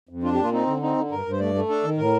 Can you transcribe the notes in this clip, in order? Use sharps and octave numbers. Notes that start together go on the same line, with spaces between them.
F2
D4 F4
G4
A#2
F4
C4 D#4
D3
C4 D#4
D3
G2 A#4
G2
C5
A3 D5
A3
D4 A4
D#3
A2 A#4